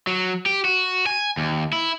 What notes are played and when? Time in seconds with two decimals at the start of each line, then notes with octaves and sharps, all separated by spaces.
0.07 F#3
0.46 G4
0.65 F#4
1.07 G#5
1.37 D#2
1.73 E4